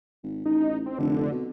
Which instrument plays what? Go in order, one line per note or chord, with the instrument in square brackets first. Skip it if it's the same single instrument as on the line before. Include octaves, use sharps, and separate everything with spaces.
[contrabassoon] G#1
[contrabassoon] A1 [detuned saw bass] D#4
[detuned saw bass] C4
[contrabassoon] F1 [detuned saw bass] D3
[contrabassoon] B2